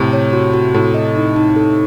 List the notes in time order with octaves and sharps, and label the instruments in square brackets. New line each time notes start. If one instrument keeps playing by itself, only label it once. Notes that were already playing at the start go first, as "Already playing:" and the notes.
Already playing: [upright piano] A2 C3
[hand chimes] C#5
F#4
F#4
[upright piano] A2 [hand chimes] A4
[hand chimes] D#5
D#4
D#4
A4